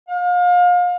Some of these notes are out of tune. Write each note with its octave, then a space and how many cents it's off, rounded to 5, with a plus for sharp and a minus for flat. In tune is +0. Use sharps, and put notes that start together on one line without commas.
F5 +35